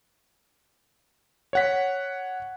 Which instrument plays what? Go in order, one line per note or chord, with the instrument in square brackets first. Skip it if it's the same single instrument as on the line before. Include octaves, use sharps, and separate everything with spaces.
[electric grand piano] C#5 F#5 B6